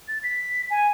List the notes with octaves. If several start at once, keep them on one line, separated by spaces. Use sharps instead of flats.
A6
B6
G#5